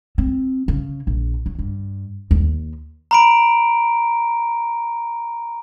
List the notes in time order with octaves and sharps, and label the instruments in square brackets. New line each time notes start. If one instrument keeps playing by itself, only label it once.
[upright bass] C4
C#3
A#1
F#3
G2
D#2
[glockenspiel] A#5 B5 D7